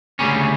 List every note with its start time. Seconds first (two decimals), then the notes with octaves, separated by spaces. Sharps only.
0.19 D2 C#3 G3 C#4